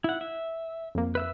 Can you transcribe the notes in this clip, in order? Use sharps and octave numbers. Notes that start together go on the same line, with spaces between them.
E4 F#5
E5
F2 A#3
B4 E5 E6